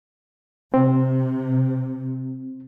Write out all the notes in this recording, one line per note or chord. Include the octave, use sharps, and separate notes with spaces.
C3 C4